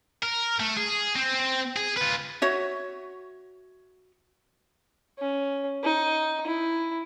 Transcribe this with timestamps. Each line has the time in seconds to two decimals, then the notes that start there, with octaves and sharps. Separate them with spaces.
0.23 A#4
0.60 A3
0.77 G#4
1.15 C4
1.76 G#4
1.97 F4 B4
2.42 F#4 C#5 E5
5.19 C#4
5.83 D#4
6.47 E4